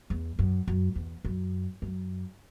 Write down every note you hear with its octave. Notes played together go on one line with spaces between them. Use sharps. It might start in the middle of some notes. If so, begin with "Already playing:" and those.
E2
F#2
F#2
E2
F#2
F#2